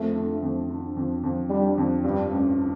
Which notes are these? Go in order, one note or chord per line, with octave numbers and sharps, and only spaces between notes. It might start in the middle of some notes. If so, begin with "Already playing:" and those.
Already playing: F2 A3
D3
F2
D3
F2
F2
D3 G3
F2
G2 G3
A1
D3